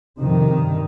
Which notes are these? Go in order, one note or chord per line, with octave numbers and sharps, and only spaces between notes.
F2 C3 D#3
G2